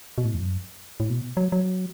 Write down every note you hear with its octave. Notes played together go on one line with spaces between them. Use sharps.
B2
A2
E2
F#2
A2
B2
F#3
F#3